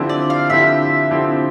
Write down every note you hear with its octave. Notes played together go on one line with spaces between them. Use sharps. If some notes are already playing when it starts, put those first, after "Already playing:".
Already playing: D3 F3 C4 E4 G4
D5
F5
D3 F3 C4 E4 G4 E5
D3 F3 C4 E4 G4